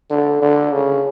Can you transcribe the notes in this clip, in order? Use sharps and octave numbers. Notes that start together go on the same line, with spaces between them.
D3
D3
C#3